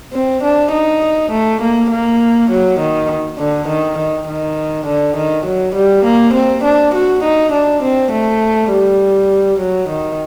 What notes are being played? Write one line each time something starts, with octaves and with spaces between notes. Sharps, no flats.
C4
D4
D#4
A3
A#3
A#3
F#3
D#3
D3
D#3
D#3
D#3
D3
D#3
F#3
G3
A#3
C4
D4
F#4
D#4
D4
C4
A3
G3
F#3
D#3